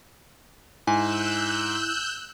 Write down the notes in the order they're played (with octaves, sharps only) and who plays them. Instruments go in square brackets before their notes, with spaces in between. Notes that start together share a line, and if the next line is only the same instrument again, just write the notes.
[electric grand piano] G#2 [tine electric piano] E4 [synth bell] G#5 [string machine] E6 F#6 G6